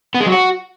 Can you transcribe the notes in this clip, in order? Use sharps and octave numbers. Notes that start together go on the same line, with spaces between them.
B3
G#3
F#3
F#4